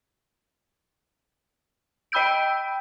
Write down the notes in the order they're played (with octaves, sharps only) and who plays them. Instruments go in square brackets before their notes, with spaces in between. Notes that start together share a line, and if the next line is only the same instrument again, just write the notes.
[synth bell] D#5 G5 B5 E6 G6 D7